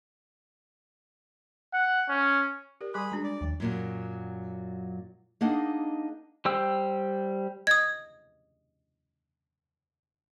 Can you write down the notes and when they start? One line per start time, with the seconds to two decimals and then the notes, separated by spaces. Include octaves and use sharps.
1.74 F#5
2.09 C#4
2.81 G4 A#4 D5
2.94 G3 G#4 B5 C6 D6 D#6 F#6
3.12 G#3 D4 F#4 A#5
3.23 D5
3.41 D#2 F3
3.60 F#2 A#2 F#3
5.41 A#3 D4 D#4 G#4 D#5 F#5
6.45 G3 C5 G5 E6
7.67 D#5 D#6 G#6